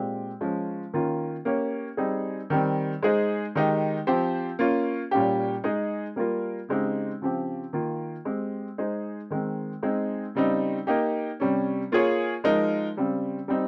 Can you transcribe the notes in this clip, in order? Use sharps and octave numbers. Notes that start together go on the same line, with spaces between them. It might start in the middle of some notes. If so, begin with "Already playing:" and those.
Already playing: A#2 G#3 C4 G4
F3 G#3 C#4
D#3 A#3 C#4 F4
A#3 C#4 G4 C#5
G3 C4 D#4 G#4
D#3 G3 C4
G#3 D#4 G#4 C5
D#3 G#3 D#4 G4
F3 C4 G4 C5
A#3 C#4 F4
A#2 G3 C#4 G4
G#3 D#4 G#4
G3 A#3 F4 A#4
C#3 G#3 C4 D#4 G4
C#3 F3 C4 G4
D#3 A#3 F4
G#3 C4 G4
G#3 D#4 G#4 C5
D#3 G#3 C4
G#3 C4 D#4 G#4
C#3 G3 C4 D#4
A#3 D#4 G4
C3 G3 C#4
A#3 F4 G#4 C#5
F3 G#3 D#4 A#4
C#3 G3 C4
G3 C4 D#4